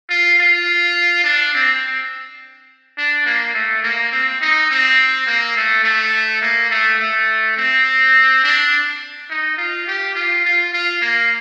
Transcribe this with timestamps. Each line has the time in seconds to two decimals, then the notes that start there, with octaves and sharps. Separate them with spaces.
0.09 F4
0.39 F4
1.24 D4
1.54 C4
2.97 D4
3.26 A#3
3.54 A3
3.83 A#3
4.11 C4
4.41 D#4
4.70 C4
5.27 A#3
5.56 A3
5.84 A3
6.42 A#3
6.70 A3
6.99 A3
7.57 C4
8.44 D4
9.30 D#4
9.57 F4
9.87 G4
10.15 F4
10.44 F4
10.73 F4
11.02 A#3